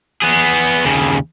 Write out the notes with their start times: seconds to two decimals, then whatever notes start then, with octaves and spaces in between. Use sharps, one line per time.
0.22 B3 G#4
0.85 D#2 C#3